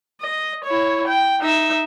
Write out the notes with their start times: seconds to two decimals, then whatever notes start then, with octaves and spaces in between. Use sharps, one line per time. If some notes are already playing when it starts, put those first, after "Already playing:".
0.21 D#5
0.64 E4 C#5
1.07 G5
1.41 D#4 E5